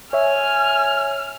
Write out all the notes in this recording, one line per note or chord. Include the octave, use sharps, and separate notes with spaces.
C#5 E5 G#5 F6